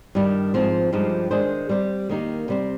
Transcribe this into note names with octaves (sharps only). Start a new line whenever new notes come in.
G2 D#3 G3
G#2 F3 C4
G2 F3 G#3 D#4 G4
D#3 G#3 D4 G#4 C5
G3 C4 G4 C5
D#3 A#3 D#4 G4
C3 G3 C4